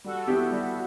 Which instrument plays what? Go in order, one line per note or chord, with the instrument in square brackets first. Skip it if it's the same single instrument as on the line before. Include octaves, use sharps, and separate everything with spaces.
[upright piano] G3 [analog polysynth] F#4 A4
[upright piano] B3 E4 G4
G3